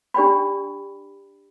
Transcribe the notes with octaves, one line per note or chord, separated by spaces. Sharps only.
D4 G4 D5 G5 B5